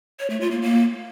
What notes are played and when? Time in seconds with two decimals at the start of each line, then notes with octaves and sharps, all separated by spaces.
0.19 C#5
0.30 A3
0.41 F4
0.51 A#3
0.62 A#3